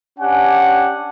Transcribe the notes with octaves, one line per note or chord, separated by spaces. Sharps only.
C#4 D4 G4 F#5 G#5